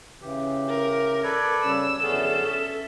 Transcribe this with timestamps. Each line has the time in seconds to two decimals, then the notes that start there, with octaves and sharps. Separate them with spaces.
0.22 C#3 E3 G4
0.68 A#4
1.24 A4 B4 D5 G#6
1.63 C#3 G3 C#4 E6 E7
2.03 F#2 D3 E3 B3 C#4 G#4 A4
2.46 C#4 E5